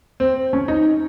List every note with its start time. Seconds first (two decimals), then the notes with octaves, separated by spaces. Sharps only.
0.20 C4
0.53 C#4
0.68 D#4